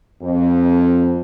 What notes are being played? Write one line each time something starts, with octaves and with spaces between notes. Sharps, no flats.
F2